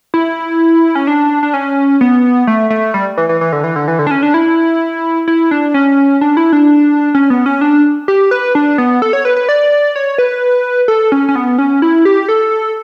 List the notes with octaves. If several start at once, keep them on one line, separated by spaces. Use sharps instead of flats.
E4
C#4
D4
D4
C#4
B3
A3
A3
G3
E3
E3
E3
D3
E3
D3
E3
D3
D4
C#4
D4
E4
E4
D4
C#4
D4
E4
D4
C#4
B3
C#4
D4
G4
B4
D4
B3
A4
C#5
B4
B4
D5
C#5
B4
A4
C#4
C#4
B3
C#4
E4
G4
A4